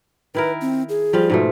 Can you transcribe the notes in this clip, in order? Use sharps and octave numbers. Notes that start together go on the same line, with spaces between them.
D#3 E4 A#4 B4
C4
G#4
F3 G3 F4
G#2 B2 A3